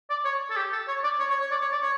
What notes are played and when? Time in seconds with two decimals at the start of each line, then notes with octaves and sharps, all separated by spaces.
0.10 D5
0.25 C#5
0.50 A4
0.57 G4
0.72 A4
0.88 C#5
1.04 D5
1.20 C#5
1.30 C#5
1.41 C#5
1.51 D5
1.62 C#5
1.72 D5
1.82 C#5